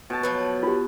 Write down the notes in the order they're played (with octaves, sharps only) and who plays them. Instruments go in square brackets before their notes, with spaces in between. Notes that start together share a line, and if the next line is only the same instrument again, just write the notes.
[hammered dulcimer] B2 A5
[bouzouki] F3 F#3 B4
[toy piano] F4 G4